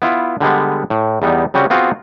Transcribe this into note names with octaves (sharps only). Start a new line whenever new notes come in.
B3 E4 F4
D3 G3 G#3 B3
A2
E2 G3 B3 D#4
C#3 G3 C4 C#4 F#4
B3 C4 F4 F#4 G#4